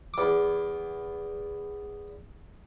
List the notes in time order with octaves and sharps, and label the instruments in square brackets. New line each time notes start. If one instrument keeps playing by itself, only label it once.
[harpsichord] E2 D6